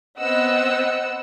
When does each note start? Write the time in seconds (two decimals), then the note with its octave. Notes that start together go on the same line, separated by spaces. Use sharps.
0.20 B3 C4 D#5 F#5 E6